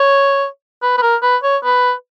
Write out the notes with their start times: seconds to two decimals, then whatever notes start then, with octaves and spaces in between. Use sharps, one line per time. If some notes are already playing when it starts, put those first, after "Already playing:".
Already playing: C#5
0.82 B4
0.97 B4
1.02 A#4
1.22 B4
1.43 C#5
1.64 B4